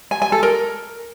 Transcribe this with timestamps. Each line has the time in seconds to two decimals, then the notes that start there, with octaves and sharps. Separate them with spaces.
0.11 G#5
0.22 G#5
0.32 A4
0.43 A#4